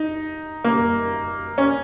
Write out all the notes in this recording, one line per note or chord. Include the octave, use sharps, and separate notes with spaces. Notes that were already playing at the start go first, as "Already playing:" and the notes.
Already playing: D#4
A#3
C#4